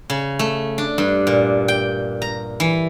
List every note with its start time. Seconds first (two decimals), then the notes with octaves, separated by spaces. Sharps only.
0.10 C#3
0.39 A3
0.78 D4
0.98 G2
1.27 A#2
1.68 G5
2.22 A#5
2.60 E3